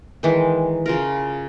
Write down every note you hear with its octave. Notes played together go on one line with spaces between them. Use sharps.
D#3 E3 G#3
C#3 F4 A#4